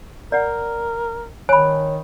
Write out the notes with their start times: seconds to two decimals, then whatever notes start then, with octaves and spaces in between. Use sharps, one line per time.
0.32 A#4 D5 F#5
1.49 D#3 C#5 G#5 B5